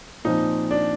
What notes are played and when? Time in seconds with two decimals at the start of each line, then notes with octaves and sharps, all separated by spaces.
0.25 A#2 F3 C4 D#4
0.71 D4